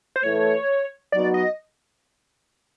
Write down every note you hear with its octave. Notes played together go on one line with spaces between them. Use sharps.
C5
A2 E3 A3 C#5
F#3 B3 D#4 F#4 D5
D#5